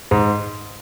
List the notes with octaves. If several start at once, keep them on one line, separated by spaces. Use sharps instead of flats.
G#2